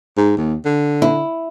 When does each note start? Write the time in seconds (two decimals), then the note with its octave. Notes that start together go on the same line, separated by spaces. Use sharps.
0.17 G#2
0.37 D#2
0.66 D3
1.02 E4